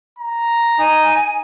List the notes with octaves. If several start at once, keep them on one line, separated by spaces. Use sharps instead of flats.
A#5
D#4 G#5